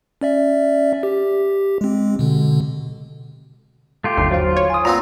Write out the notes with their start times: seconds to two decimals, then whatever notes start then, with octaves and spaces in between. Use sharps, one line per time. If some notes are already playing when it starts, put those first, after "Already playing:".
0.21 C#4 D5 E5
1.03 G4
1.81 G#3 C4
2.19 B2 D3
4.04 A3 F4 G4
4.18 G1 D#2 C7
4.31 F#3 F4 C5 F5
4.57 C#5
4.70 G#5 D#6
4.85 A#2 B3 C4 A#5